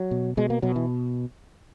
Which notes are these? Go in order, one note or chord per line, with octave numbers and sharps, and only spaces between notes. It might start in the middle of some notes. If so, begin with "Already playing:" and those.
Already playing: F#3
B2
B2 G#3
A#3
B2 F#3
E3